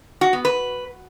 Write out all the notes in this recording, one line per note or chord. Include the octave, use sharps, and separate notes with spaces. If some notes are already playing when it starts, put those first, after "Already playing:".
F#4
B3
B4